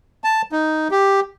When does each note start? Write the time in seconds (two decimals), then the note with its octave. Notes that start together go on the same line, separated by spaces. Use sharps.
0.24 A5
0.52 D#4
0.91 G4